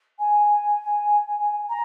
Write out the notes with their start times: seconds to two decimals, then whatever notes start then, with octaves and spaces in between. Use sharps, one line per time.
0.19 G#5
1.69 A#5